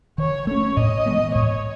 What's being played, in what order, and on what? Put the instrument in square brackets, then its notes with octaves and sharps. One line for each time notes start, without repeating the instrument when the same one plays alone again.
[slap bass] D#3 [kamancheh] C#5
[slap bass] A3 C#4 [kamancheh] C#5
[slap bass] A2 [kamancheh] D#5
[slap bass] E3 G#3 B3
[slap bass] A2 [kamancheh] C#5